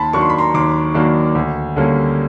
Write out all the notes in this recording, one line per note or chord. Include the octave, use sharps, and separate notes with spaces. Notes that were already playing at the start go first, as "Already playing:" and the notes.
Already playing: D#2 A5 B5 C6
D#3 F#3 A#3 D4 C#6
C6
B5
A#5 C6
D#2 C6 D6
D#3 F#3 A#3 D4
D2
D3 G3 A#3 C#4